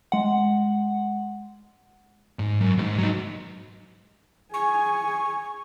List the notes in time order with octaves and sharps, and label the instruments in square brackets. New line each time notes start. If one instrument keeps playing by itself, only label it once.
[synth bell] G#3 F#5
[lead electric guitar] G#2
F#2
D2 G#2
F#3 D#4
[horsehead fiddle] G#4 G#5 [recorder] C#6